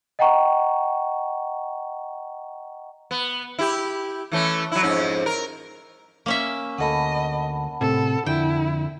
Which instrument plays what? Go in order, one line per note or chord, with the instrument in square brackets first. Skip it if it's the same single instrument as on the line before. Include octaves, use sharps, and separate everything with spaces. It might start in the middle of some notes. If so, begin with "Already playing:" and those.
[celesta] D#5 F#5 G5 A#5 C#6
[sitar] B3
E4 G4
E3 A3 C#4
F#3 E4
F2 G#2 C#4
A#4
[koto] A#3 C#4 E5
[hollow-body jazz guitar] D2 A4 [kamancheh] D#5 [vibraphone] F#5 A5 B5
[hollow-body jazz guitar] A2 C3 [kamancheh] A4
[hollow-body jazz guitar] F2 D3 [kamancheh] E4 [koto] G5